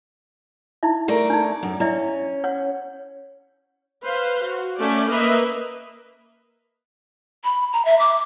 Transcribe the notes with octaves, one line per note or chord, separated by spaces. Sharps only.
D#4 E4 E5
A3 A#4 D5
D4 D#4
F#2
C#4 E4 D5 E5
C#5 F#5
B4 C5 F5
F#4
A3 C#4 D5
A#3 B4 D#5 E5
B5
A#5
E5
D6